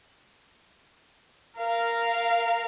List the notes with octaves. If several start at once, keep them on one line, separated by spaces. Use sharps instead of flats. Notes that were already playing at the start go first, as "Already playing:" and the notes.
A#4 F5